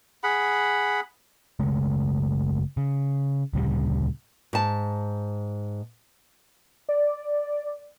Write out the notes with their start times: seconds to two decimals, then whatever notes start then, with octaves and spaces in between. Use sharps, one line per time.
0.23 G#4 F#5 B5
1.59 F#1 C#3 G#3 A3
2.77 C#3
3.54 D2 A#2 C#3 G3
4.53 G#2 A5
6.89 D5